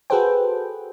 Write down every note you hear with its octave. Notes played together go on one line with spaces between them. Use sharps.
F#4 G#4 A4 B4 C5 G5